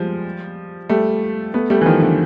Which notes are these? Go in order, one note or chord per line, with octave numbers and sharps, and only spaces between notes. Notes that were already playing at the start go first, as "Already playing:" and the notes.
Already playing: F3 G3 G#3
G3 A3
A3 B3
G3 A3
E3
D#3 F3
D3 E3